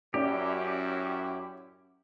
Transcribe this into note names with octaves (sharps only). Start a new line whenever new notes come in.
F#2 C#4 E4 G4 D5